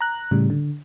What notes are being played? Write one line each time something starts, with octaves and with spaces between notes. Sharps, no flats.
A#5 F#6
A2 C#3 G3
D3